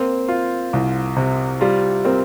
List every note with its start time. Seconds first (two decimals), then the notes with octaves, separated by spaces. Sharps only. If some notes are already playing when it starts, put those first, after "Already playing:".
Already playing: A#3 C4
0.28 F4
0.73 C2
1.16 C3
1.61 G3 F4
2.04 C4 A#4